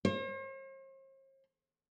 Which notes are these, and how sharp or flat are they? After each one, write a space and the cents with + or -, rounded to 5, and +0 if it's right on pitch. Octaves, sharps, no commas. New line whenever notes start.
C5 +45